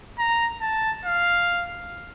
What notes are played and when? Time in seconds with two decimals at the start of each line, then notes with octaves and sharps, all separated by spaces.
0.19 A#5
0.61 A5
1.05 F5